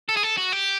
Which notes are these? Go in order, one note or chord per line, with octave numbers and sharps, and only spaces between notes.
A4
G#4
A4
F#4
G4